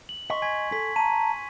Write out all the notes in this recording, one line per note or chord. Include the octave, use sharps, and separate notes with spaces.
F#7
D#5 C6 C#6 B6
G#5 G#6 B6
A4 B6
A5 A#5 D#7